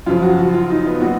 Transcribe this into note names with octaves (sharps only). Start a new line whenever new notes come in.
F#2 C#3 F3 F4
F#4
F#4
F4
D#4
B3
A#2 F#3 F#4